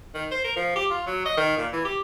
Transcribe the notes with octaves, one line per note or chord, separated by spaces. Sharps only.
D#3
C5
A#4
F3
G4
F4
F#3
D#5
D#3
A#2
E3
G4